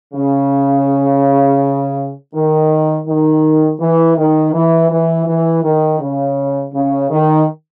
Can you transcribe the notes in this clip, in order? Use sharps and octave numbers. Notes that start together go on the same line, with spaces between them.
C#3
D#3
D#3
E3
D#3
E3
E3
E3
D#3
C#3
C#3
D#3